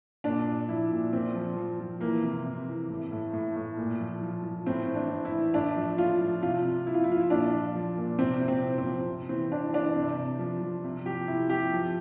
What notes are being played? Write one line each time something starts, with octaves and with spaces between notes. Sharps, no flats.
A#2 D4
A#2
F3 E4
A#2
A#2 C4
F3
F3
F3
E3 A#3
C3
C3
E3
A2
A2
A2
A2
A#2
F3
F3
F3
A2 C4
E3
D4
A2
E4
E3
A2 D4
F3
A2 F4
F3
C3 F4
C3
F3 E4
F4
E4
F3 F4
E4
A#2 D4
F3
F3
A#2
C3 C4
C3
C4
C3
C4
F3
C3
E3 C4
E3 D4
E3 D4
C3
C3
F3
F3
C3
F3 G4
C3 E4
F3 G4
F3